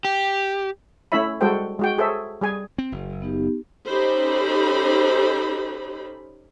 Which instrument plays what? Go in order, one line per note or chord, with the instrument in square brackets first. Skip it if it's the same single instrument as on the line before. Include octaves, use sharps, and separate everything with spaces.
[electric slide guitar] G4
[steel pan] A3 C#4 E4 C#5 E5 B5
G3 G#3 F#4 A4 C5 G5
G#3 F#4 G5
G#4 A4 C5 C#5 E5
G3 G#4 G#5
[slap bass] C4
F#1
[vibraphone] B3 D#4 G4
[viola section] C#4 D#4 G4 A4 C5 B5